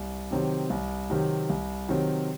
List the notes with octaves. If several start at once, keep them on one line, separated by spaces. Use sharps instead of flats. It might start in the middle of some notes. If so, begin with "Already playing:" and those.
Already playing: C2
C3 D#3 F#3 C4
C2
C3 D#3 F#3 C4
C2
C3 D#3 F#3 C4